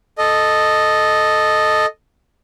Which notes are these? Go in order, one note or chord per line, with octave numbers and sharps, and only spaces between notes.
A4 D#5